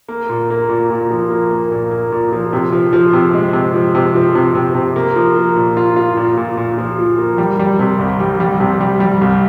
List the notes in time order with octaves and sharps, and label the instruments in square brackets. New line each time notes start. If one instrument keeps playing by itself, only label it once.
[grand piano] A#3
A#2
A#3
A#2
A#2
F3
A#3
A#3
A#2
A#3
A#2
F3
C3
F3
F3
C3
G#3
C3
F3
C3
F3
C3
C3
C3
A#3
F3
A#3
A#2
F4
F4
A#2
A#2
A#2
F3
F3
A#3
G3
G3
C3
C2
G3
G3
C3
G3
G3
C2